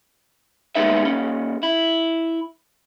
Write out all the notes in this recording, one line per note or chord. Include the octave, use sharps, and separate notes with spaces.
D#2 G3 G#3 B3 D#4 E5
A#2 C#4
E4